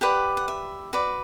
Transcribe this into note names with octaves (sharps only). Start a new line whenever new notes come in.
G4 B4 D5 F#5
F#5
E5
F#4 B4 D5